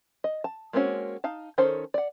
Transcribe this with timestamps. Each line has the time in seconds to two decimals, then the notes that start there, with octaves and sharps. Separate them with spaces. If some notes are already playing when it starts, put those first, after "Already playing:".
0.24 D#5
0.44 A5
0.73 G#3 A#3 C4 C#4 F#4
1.24 D#4 F5 A5
1.58 D#3 C#4 A4 C5
1.94 D5 F#5